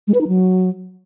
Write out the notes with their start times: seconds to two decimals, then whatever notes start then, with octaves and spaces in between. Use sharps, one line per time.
0.08 G#3
0.14 B4
0.21 D#4
0.28 F#3